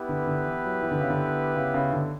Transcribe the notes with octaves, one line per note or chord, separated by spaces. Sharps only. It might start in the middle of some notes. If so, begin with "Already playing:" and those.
Already playing: B3 E4 G4 B4
D3
D3
E3
F#3
E3
D3
C#3
D3
C#3
C#3
D3